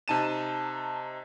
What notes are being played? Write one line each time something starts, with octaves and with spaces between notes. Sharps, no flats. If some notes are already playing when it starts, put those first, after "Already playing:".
C3 D#4 A5 D#7 E7